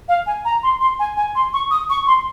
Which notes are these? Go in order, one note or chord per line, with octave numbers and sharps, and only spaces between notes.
F5
G#5
A#5
C6
C6
G#5
G#5
C6
C#6
D#6
C#6
C6